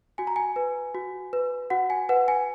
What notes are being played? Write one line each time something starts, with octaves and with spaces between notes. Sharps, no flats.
F#4 G#5
A#5
G#5
B4
F#4
B4
F#4 F#5
G#5
B4 F#5
G#5